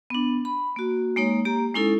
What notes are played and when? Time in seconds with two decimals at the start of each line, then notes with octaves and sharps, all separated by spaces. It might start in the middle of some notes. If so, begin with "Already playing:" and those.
0.10 B3 D4
0.45 B5
0.76 A#3 F#4
1.16 G#3 A#3 D#4 C#5
1.45 A#3 G4 A#5
1.75 G#3 C#4 D#4 E4 A4